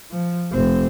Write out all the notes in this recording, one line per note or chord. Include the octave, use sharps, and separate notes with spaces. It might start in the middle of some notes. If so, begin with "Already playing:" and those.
F3
F1 C4